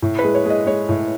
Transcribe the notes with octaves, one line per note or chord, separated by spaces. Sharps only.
A2
B4
G#3
C#5
G#3 D#5
G#3 C#5
A2